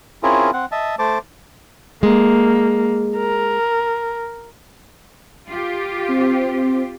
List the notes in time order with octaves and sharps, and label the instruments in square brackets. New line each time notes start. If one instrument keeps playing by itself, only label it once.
[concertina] C4 C#4 E4 F4 G#4 A#4
C4 F#5
D#5 E5 A5
A3 C5 A5 D6
[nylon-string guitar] G#3 [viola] A#3
[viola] A#4
[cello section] F4 G4
[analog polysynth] C4